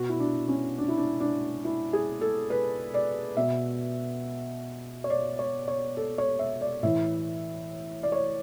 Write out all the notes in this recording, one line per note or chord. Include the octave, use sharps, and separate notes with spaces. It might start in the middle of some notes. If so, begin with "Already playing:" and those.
Already playing: B2 F#4
E4
D4
C#4
D4
E4
D4
D4
E4
G#4
A4
B4
D5
B2 E5
C#5
D5
C#5
C#5
A4
C#5
E5
D5
A2 E3 E5
D5
C#5